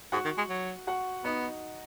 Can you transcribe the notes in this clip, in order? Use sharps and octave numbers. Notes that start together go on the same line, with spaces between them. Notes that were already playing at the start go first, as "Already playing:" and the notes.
G#2 F#4 F#5
D#3
G#3
F#3
F#4 F#5
B3 D#4 D#5